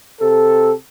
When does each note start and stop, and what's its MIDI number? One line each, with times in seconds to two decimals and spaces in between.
0.19 0.72 48
0.19 0.72 69